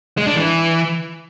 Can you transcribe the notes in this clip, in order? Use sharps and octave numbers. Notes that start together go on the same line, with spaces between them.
G#3
D4
E3